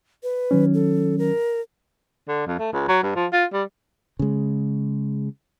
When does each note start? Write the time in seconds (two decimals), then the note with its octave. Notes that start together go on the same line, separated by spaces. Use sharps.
0.23 B4
0.51 D#3 F#3 C#4
0.74 A4
1.19 A#4
2.28 D3
2.46 F2
2.59 A3
2.73 C#2
2.88 F#3
3.03 G2
3.16 F3
3.32 F4
3.53 G3
4.19 C#3 G#3